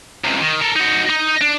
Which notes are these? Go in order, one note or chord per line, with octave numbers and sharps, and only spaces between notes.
C#2 C3
D#3
A4 A#4
D#4 F#4
D#4
D4